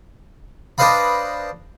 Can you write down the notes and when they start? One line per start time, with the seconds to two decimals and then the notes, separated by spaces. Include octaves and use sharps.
0.78 D4 B4 C5 D#5 F5 B5